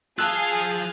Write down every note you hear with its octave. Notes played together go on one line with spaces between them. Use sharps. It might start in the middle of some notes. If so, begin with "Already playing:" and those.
F4 G#4 F5 A5 E6 F#6